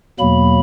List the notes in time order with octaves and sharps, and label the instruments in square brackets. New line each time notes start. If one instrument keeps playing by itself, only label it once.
[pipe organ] E2 B2 F#3 A#3 B5